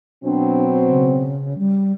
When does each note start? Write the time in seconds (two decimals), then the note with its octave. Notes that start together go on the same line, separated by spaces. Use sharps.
0.24 B2 F#3 C4 D4
0.89 C#3
1.58 G3